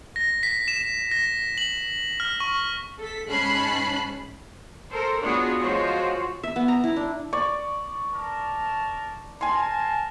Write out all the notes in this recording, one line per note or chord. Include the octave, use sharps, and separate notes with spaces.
A#6
B6
E7
A#6
F#7
F6
C#6
A4 B6
G#2 C#4 A5 B5 F#6 C7
A4 A#4 C5
B3 D4 F4 F#4 G#4 C#5
F3 G#3 F4 F#4 C5 C#5
E5
B3
A#5
E4
D4
D5 C#6
A#4 A5
A#4 G#5 A5 C6